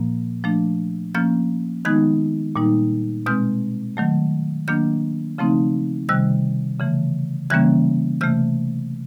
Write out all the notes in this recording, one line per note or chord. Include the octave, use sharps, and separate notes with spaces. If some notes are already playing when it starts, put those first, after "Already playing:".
Already playing: A#2 F3 A#3
F3 A3 D4
F3 A#3 C#4 F6 G6
D#3 G#3 B3 D#4 F#6 G#6
A#2 G3 A#3 D#4
B2 G#3 C4 F6 G6
D#3 F#3 A3
D#3 F#3 A#3 D4 F6 G6
C#3 F3 A3 C4 D#4
C3 D#3 G3 E6 F#6
C#3 E3 A3
C#3 E3 G3 A#3 C#4 F#6 G#6
C3 E3 A3 F6 G6